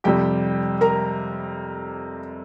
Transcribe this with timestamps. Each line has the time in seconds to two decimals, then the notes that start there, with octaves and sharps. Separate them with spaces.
0.04 F2 C3 G3 G4 G5
0.81 A#4 A#5